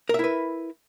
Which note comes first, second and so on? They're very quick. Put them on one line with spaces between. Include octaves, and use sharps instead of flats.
A#4 E5 E4 B4